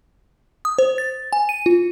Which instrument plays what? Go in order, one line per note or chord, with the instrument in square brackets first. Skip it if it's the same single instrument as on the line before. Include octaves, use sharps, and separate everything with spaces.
[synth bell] D#6
C5
A6
G#5
D#7
F4